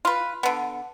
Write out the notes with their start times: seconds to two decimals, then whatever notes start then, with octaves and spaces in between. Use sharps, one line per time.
0.05 F4 B4
0.43 D3 B3